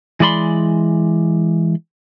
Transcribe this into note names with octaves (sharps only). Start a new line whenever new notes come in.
E3 G#3 D5 B5 C6